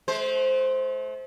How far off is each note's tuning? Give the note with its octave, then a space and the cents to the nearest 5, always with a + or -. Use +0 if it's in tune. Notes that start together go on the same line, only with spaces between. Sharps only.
A3 -40 C5 +0